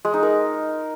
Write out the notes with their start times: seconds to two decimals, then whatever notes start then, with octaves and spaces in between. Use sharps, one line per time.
0.05 G#3
0.14 D#4
0.23 A#4